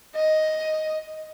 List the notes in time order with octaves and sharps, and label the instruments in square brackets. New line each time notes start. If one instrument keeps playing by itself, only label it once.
[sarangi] D#5